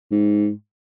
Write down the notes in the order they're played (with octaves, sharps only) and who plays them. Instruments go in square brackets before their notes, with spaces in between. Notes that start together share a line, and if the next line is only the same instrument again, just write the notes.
[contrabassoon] G#2